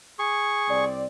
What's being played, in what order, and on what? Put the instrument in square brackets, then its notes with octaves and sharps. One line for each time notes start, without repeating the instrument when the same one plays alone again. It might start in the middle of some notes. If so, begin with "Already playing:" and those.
[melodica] G#4 C#6
[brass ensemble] C2 C4 D5